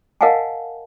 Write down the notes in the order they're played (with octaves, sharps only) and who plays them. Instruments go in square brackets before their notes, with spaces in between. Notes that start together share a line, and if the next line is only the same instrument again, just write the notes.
[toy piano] A#4 D#5 F5 F#5 G#5 A5